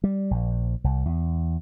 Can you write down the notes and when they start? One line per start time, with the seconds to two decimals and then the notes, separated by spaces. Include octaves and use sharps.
0.04 G3
0.31 A#1
0.84 C2
1.05 E2